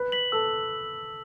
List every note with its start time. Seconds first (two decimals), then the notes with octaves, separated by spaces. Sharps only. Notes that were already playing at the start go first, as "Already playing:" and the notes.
Already playing: B4
0.12 B6 F#7
0.32 A4 E6